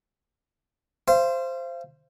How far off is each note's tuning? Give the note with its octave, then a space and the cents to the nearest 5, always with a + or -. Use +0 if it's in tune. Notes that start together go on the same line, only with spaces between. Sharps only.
C5 +0 F5 -35